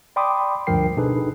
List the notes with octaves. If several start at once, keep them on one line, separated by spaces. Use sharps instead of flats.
D5 G5 B5 C6 D6 D#6
D2 G2 F3 A#4 G5 C7
B2 D4 D#4 G#4 A4 B4